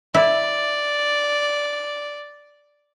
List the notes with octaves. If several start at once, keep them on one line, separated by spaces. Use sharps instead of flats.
E4 D5